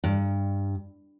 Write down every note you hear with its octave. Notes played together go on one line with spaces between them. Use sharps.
G2